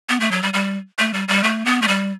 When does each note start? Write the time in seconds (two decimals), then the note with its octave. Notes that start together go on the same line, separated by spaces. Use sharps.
0.09 B3
0.20 A3
0.31 F#3
0.43 G3
0.54 G3
0.99 A3
1.14 G3
1.28 G3
1.43 A3
1.66 B3
1.82 A3
1.88 G3